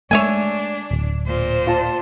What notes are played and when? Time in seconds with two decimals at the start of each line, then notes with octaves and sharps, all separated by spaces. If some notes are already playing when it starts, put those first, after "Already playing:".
0.11 G#3 A3 D4 C#5 E5 G#5
0.91 D1
1.26 A#2 C5
1.67 F4 A5